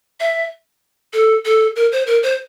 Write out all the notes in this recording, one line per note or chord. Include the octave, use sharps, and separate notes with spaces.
E5
A4
A4
A#4
C5
A#4
C5